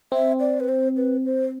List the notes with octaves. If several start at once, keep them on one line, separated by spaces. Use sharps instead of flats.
C4 E5
D5
B4
C5
B4
C5